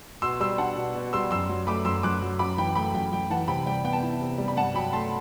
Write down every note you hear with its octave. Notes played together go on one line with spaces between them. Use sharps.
B2 C6 E6
G3 C6 E6
D4 F#5 A5
B2
B2
G3 C6 E6
F#2 C6 E6
F#3
A3 B5 D6
F#2 C6 E6
F#2 D6 F#6
F#3
F#2 B5 D6
E3 G5 B5
A3 G5 B5
F#2 G5
F#2 G5
E3 F#5 A5
C3 G5 B5
G3 G5
B3 G5
A5
E4 G5
C3
G3
B5
G2 F#5 A5
F#3 G5 B5
A3 A5 C6